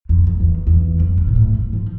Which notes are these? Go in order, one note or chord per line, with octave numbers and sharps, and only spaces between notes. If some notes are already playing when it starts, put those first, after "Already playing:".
F2
F2
E2
E2
F2
G2
A#2
A2
G2
F3